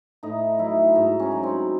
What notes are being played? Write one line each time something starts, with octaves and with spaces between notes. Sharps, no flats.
A2 D#4
F#3 E4
G#2 D#4
C#4
F#3
C4